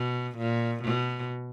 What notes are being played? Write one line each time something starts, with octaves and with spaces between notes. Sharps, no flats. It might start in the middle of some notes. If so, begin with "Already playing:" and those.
Already playing: B2
A#2
B2